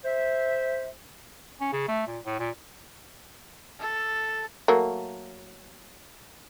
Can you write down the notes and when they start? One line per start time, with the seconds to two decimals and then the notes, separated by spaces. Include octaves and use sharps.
0.05 C5 E5
1.60 C#4
1.72 C#3
1.88 A3
2.07 A#2
2.25 A2
2.39 A#2
3.80 A4
4.68 F#3 A3 A#3